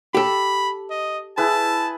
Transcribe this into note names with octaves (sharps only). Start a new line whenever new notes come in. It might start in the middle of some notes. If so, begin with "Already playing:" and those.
G4 A4 B5
D#5
E4 G#4 B4 A5